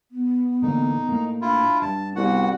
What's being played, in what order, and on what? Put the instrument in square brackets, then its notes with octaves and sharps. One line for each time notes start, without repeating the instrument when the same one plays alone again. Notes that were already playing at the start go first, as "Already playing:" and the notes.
[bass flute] B3
[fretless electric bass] A1 D3 A#3 [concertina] D#4
[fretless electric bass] A2 A#3
[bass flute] D4 [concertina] E4 F4
[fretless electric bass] G2 [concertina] A5
[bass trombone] C2 [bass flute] B3 [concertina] F#4 F#5